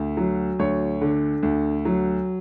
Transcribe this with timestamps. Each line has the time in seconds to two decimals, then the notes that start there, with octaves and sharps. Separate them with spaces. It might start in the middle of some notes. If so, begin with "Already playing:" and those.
Already playing: D2
0.17 F#3
0.59 D2 C#5
1.01 D3
1.43 D2
1.85 F#3